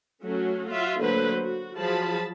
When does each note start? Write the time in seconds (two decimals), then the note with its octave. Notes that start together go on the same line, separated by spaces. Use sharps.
0.24 F#3 A3 C#4 F#4
0.69 F4 F#4 E5
0.99 D3 F#3 A3 A#3 B4 C5
1.44 F#4
1.76 F3 F#3 F4 G#4 A5 B5